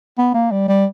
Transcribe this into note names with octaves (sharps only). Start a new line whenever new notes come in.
B3
A#3
G3
G3